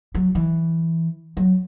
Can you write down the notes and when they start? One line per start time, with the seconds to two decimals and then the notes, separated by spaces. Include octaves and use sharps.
0.15 F#3
0.35 E3
1.37 F#3